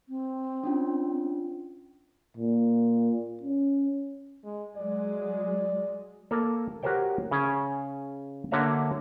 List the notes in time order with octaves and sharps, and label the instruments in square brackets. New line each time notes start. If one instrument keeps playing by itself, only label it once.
[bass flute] C4
[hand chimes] C#4 D4 F4
[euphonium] A#2
C#4
[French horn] G#3
[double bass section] F#3 G#3 [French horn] D5
[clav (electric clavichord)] A#3 A4 A#4
F#4 G4 A#4 C5 C#5 G5
C#3 C#4 G#4
D3 A#3 F#4 C#5 E5 A#5